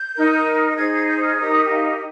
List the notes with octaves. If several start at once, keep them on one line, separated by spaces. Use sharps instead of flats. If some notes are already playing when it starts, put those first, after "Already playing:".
Already playing: G6
D#4 A#4
D#4 G#4 C5 G#6
G#6
G6
F6
D#4 G4 A#4 D#6
G5
F5